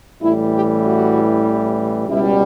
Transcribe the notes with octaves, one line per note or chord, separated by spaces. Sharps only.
A1 A2 E3 G3 E4
G4
F#4
C#2 B2 G3 E4